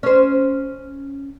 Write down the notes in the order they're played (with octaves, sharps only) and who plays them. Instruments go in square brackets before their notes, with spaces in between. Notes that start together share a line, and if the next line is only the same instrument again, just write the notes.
[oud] C#4 C5